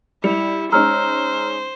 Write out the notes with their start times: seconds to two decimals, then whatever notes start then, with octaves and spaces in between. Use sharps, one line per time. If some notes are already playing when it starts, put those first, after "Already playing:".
0.24 G3 E4 C#7 F7
0.72 G#3 C#4 D#4 C5 A#5 E6 F6